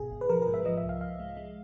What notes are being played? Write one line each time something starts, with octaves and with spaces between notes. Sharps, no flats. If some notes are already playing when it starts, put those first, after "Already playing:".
Already playing: G#1 B2 G#4
G#1
B4
F3 A#4
A#4
G#2
E5
F3 D#5
E5
C2
F5
C2 F5
G#3
G#3